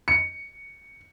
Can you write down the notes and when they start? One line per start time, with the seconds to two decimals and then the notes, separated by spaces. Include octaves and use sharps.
0.08 C#7